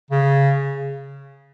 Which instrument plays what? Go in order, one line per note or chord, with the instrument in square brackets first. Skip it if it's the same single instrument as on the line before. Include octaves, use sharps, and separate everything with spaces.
[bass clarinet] C#3